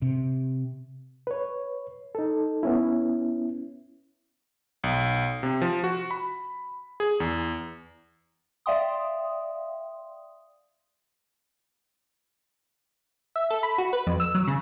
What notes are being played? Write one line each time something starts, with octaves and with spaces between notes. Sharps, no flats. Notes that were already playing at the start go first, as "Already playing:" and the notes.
C3
B4 C#5
D#4 A4
B3 C#4 E4
B1
C3
F3
F#4
B5
G#4
E2
D5 E5 F5 G5 C6 D#6
E5
A4
B5
F#4
B4
F2
E6
F#3
C#3